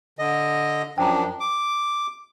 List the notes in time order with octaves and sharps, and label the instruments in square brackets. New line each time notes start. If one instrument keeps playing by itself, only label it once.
[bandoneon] D3 D#5
[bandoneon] F#2 F3 D4 [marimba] G5 A#5
[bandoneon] D6